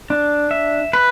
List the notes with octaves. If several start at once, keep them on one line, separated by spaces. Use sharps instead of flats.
D4
E5
B4